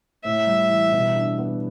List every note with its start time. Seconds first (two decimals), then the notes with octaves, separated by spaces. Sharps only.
0.24 A2 E5
0.47 G3
0.69 E3
0.92 B2
1.14 D4
1.38 B3